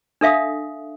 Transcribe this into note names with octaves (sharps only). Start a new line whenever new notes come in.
D4 A4 E5 F5 D#6